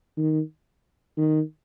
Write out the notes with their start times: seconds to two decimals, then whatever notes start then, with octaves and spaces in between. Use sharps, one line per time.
0.17 D#3
1.17 D#3